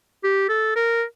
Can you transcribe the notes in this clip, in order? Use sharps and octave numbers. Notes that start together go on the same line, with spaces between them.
G4
A4
A#4